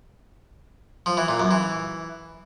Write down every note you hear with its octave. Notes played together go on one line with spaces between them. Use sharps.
F3
E3
A#2
F#2
E3